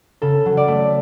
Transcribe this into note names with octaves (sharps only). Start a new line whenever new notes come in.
C#3 A4
F#3
D5
A3